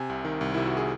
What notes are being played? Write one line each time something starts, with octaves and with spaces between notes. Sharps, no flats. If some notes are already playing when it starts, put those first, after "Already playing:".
Already playing: C3 G#5
C2
D#3
C2
C3 E4
F#4
G#4